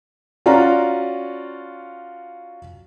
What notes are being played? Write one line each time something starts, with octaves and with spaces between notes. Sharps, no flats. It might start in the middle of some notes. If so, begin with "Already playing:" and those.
C#4 F4 F#4 D5 A#5